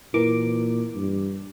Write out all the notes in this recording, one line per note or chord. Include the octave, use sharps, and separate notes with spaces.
A#2 E3 A#4 D6
G2